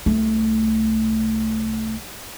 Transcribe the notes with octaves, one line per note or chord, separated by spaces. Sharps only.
C2 A3